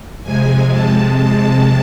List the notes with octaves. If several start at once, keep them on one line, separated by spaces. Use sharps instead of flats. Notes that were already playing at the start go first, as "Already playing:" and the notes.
F2 C3 G#3 G#5
A5
A5